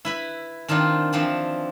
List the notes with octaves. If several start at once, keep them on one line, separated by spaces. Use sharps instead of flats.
E4 B4 B5
D#3 C4 D4 D#4 F4
E3 F3 C4 D4